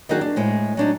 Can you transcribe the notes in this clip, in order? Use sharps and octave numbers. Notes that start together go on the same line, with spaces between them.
D#3 F#3 D4 D#4 F#4 G#4
D4
A2 G#3 C5
F#3 D4 D#4